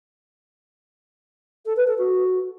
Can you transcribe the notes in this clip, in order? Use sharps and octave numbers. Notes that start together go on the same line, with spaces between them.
A4
B4
A4
F#4